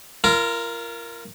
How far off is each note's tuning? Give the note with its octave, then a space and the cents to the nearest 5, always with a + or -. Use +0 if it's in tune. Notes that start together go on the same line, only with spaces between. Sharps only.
F4 -35 A#4 +0